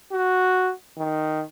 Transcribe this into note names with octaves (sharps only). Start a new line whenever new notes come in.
F#4
D#3